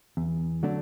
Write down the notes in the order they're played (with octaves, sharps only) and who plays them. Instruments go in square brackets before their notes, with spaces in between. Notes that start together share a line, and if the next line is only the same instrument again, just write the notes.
[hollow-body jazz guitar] E2
D3 F#3 A3 D4